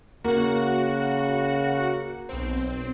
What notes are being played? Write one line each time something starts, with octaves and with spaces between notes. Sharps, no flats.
C#3 A#3 F#4 F#5
B1 C4